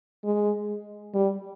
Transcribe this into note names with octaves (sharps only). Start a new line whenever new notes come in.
G#3
G3